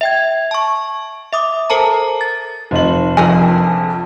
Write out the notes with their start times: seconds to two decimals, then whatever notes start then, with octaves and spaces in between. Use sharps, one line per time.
0.01 E5 G5 G#6
0.51 A5 C#6
1.33 E5 D6 D#6
1.70 A4 A#4 C5 A5 A#5
2.21 A6
2.71 F1 D#4 F#7
3.17 A#1 F2 A4 A#4 G#5